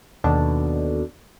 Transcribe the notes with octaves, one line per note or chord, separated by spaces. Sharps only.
D#2 B2 D3 D4